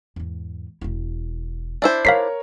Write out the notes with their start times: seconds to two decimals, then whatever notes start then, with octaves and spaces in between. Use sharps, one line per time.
0.16 E2 G#2
0.81 E1 E4
1.82 D4 E4 C5
2.05 D#4 A#4 C#5 F5 B6 C7